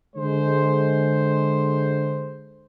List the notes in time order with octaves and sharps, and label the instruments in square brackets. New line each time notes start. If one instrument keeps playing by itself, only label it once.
[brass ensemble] D3 G#3 C5